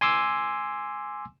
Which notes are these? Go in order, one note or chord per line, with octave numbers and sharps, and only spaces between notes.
G#5 C6 D6 E6